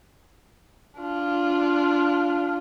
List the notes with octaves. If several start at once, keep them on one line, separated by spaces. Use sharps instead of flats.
D4 F4